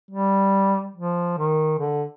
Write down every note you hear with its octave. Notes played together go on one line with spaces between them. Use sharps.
G3
F3
D#3
D3